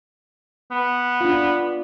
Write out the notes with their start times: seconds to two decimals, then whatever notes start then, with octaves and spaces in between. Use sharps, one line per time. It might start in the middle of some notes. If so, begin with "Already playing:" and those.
0.71 B3
1.21 D4 F4